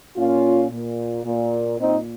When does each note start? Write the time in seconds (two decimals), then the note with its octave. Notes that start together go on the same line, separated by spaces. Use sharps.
0.16 A#2 C#4 F4
0.71 A#2
1.24 A#2
1.79 A#2 C4 D#4